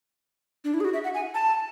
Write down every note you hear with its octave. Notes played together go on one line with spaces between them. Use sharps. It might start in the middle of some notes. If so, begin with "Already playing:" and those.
D4
E4
G#4
F#4
E5
F#5
G#5
A5